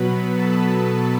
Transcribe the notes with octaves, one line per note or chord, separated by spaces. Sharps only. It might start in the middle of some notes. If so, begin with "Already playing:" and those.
Already playing: B2 F#3 B3 B4 B5
A4 A5